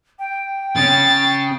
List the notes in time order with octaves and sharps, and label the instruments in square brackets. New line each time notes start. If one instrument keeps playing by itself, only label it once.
[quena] G5
[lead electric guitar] C#3 C#4 [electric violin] A6